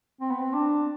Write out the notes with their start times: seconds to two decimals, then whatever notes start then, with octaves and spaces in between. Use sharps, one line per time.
0.21 C4
0.31 B3
0.42 C4
0.54 D4